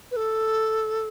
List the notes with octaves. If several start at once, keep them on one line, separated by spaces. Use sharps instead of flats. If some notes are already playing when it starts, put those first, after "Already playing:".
B4
A4